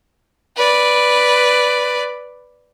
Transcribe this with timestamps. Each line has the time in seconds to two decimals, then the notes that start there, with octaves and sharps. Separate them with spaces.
0.56 B4 D5